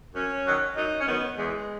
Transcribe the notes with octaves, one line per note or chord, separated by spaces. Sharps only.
F#2 C#4
D#3 F#3
F#2 D#4
C#4
D#3 F#3 B3
E2 G#3